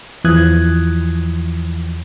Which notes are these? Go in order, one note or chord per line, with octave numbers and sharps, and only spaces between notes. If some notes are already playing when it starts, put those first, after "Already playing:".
E2 E3 F3 D#6 F#6 G#6